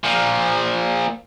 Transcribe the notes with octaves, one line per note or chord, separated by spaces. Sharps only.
A#2 F3